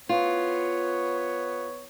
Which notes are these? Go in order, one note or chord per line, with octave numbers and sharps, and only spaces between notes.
B3 F4 C#5